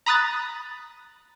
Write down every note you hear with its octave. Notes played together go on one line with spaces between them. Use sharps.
A#5 B5 D#6 F#6 A6